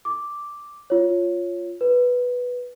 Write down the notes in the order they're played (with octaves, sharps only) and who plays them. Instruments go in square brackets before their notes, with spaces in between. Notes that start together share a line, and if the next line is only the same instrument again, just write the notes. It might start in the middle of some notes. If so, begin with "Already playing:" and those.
[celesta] D6
F4 C#5
B4